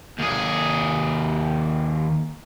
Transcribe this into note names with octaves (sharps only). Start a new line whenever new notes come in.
D#2 G#4